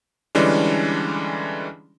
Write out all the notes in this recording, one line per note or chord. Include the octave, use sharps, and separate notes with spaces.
D3 E3 G3 G#3 C#4 D4